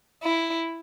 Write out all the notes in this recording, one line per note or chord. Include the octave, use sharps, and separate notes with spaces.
E4